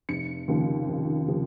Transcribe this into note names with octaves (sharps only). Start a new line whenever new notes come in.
F1 C#7
D#2 C#3 F3
F1
C#3 F3